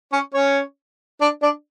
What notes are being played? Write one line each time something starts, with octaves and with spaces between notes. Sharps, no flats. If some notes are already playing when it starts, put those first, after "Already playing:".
C#4 C#5
C#4 C#5
D4 D5
D4 D5